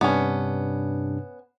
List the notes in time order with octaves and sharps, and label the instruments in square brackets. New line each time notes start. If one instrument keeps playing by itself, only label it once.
[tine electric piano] G2 C3 D4 [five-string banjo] B3 C#4